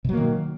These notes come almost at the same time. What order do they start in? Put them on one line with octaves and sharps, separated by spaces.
B2 F#3 A#3 D#3